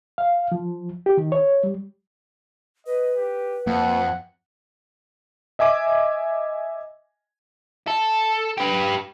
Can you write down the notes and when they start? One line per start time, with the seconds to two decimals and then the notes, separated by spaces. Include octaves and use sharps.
0.18 F5
0.52 F3
1.06 G4
1.17 D#3
1.32 C#5
1.64 G3
2.86 B4 D#5
3.16 G4
3.67 F2 A#3 F#5
5.59 D#5 E5 G#5 D6
7.88 A4
8.57 G4 B4